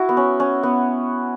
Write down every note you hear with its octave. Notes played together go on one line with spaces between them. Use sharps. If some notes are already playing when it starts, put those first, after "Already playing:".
Already playing: E4 F#4
B3
C#4
C#4
B3